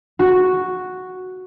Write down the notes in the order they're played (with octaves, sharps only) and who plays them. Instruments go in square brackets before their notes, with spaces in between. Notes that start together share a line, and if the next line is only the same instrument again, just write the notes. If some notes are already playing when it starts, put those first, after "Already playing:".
[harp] F#4